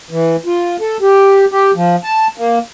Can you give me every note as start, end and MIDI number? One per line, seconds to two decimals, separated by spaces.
0.11 0.36 52
0.46 0.77 65
0.81 0.97 69
1.02 1.45 67
1.52 1.71 67
1.75 1.96 53
2.04 2.27 81
2.38 2.59 58